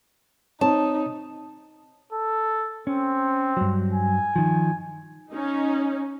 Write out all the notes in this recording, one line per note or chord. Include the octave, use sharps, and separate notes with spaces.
C4 D#4 C#5 A5
A4
C4 C#4
G2 F#3
G#5
D#3 F3
C#4 D#4